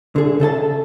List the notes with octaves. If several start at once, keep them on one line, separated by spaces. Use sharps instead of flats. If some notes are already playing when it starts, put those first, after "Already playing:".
D3 G#4
C#3 A4 D#5 A5